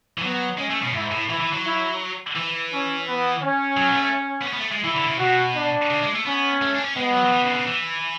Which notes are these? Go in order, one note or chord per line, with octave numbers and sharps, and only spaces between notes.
E3
F#3 B3
G#3 C#4
A3
B2
G#2 E4
A2
E3 E4
E3
F#3
E4
E3
C#4
B3
C#4
F#3
B3
A3
B3
C#4
B3
A3
G#3
E3 E4
D3
C#3
B2 F#4
D4
C#3
G#3
A3
B3 C#4
A3
D4
C#4
G#3 B3
F#3
F#3
E3
C#3
D3
C#3
E3